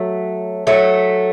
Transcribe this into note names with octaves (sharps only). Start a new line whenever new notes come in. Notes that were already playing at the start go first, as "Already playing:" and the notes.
Already playing: F#3 A3
F#3 A3